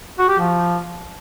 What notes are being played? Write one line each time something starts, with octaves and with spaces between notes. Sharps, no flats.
F#4
G4
F3